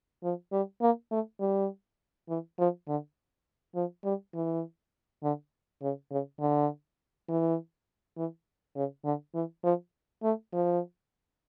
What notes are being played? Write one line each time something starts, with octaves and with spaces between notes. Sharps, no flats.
F3
G3
A#3
A3
G3
E3
F3
D3
F3
G3
E3
D3
C#3
C#3
D3
E3
E3
C#3
D3
E3
F3
A3
F3